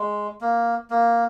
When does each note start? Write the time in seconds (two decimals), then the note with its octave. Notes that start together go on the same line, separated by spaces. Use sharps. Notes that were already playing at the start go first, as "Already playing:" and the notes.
Already playing: G#3
0.41 A#3
0.90 A#3